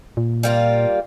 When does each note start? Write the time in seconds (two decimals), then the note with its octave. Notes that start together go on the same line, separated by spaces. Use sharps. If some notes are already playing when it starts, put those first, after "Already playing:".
0.17 A#2
0.43 G3 A#3 F4